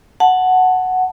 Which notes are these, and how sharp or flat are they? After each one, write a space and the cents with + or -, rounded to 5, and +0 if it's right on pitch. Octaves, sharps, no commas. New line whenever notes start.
F#5 +0 A5 +0